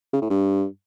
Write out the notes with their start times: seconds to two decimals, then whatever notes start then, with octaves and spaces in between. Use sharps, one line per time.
0.13 C#3
0.22 A2
0.30 G2